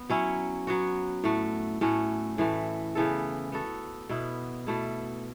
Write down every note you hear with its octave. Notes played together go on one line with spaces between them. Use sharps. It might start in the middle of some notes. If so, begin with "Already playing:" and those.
Already playing: B3
F#3 C#4 E4
F#3 B3 F#4
A2 A3 F#4
A2 A3 C#4 F#4
A2 E3 A3
C#3 E3 B3 A4
B3 F#4 A4
B2 B3 E4
B2 A3 E4